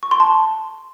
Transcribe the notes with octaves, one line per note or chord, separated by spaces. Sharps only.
C#6
C6
A5